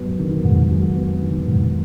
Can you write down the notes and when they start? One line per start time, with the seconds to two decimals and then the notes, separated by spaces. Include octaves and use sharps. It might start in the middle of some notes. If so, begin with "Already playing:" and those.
Already playing: G#2 F#3 B3
0.19 D#3
0.44 G#2
0.71 F#3
0.96 B3
1.22 D#3
1.48 G#2